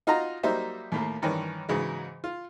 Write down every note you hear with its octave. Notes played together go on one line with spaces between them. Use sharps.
D#4 F4 F#4 D#5 A#5
F#3 G3 A#3 D#4 C5 E5
D#2 A2 A#3
G2 D#3 E3 C#4
G#2 C#3 E3 F#3 G#3
F4